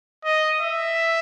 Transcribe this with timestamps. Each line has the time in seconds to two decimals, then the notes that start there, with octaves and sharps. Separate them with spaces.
0.25 D#5
0.61 E5